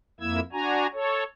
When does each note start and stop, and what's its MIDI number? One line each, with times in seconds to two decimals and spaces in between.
0.20 0.40 41
0.20 0.40 58
0.20 0.40 64
0.20 0.40 88
0.20 0.40 92
0.52 0.87 62
0.52 0.87 66
0.52 0.87 80
0.52 0.87 82
0.93 1.23 69
0.93 1.23 73